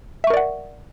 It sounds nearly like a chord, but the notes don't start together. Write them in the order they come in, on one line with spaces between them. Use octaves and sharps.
E5 C#6 A#4 D5 F#5